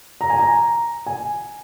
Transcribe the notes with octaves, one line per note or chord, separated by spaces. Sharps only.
A#5
G#5
A#5
G#5